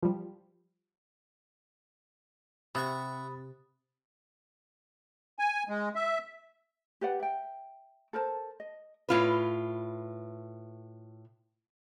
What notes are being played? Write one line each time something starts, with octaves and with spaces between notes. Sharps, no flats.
F3 G3
C3 E5 F#5 B5 C#6 D#6 A6
G#5
G#3
E5
G4 B4 D5 F#5
E5 G5
A4 A#4 C5 A5
D#5
A2 F4 B4